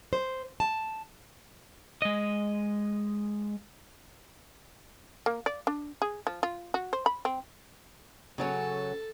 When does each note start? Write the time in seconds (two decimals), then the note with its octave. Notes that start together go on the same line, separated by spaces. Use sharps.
0.13 C5
0.60 A5
2.02 G#3 D#5
5.26 A#3
5.46 D5
5.67 D4
6.02 G#4
6.27 F3
6.43 F4
6.74 F#4
6.93 C5
7.06 B5
7.25 C4
8.38 C#3 F#3 C#4 A4